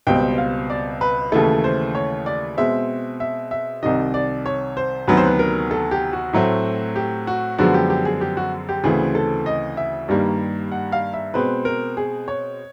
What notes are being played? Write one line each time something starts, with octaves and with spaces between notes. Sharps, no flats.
C#2 B2 G3 C4 G5
F5
D5
B4
D#2 C#3 E3 A3 A4
C5
C#5
D5
B2 G#3 C4 E5
E5
E5
C2 C3 D#3 D#5
D5
C#5
C5
D2 C3 D#3 F#3 B3 B4
C5
B4
A#4
A4
G4
F#4
A2 F#3 A3 C4
G4
F#4
F#2 D3 F3 G#3 B3 F#4
G4
G4
G#4
G4
F#4
G4
D2 C#3 E3 A3 C4 G#4
A4
D#5
E5
G2 D#3 G3 A#3
F#5
F5
E5
B2 G#3 C4 B4
A#4
G#4
C#5